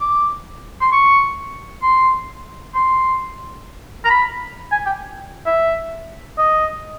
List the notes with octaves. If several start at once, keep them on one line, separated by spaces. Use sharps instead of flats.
D6
C6
C#6
C6
C6
A#5
B5
G#5
G5
E5
D#5